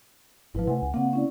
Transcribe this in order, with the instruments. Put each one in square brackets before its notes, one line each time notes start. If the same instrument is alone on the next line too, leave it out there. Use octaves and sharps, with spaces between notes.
[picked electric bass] G#1 F3 [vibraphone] E4 B4
[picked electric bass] C3 A3 [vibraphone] F#5 G#5
[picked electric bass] C#2
[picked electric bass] C#3 A#3 [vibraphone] C4 F#5
[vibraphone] C#4 E4 D5